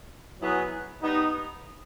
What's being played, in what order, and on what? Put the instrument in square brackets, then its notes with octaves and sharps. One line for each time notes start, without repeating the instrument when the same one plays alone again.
[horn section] F#3 B3 E4 G#4 B4
G3 B3 D#4